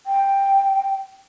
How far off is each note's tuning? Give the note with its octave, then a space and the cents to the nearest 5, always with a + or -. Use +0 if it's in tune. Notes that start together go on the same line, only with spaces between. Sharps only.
G5 +5